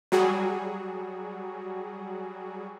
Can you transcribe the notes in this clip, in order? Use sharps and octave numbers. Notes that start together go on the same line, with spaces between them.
F#3 G3 F#4 G#4